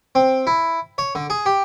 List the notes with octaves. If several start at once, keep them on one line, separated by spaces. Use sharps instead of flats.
C4
E4
C#5
D3
G#4
G4